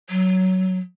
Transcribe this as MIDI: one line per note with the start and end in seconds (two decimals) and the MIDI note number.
0.10 0.79 54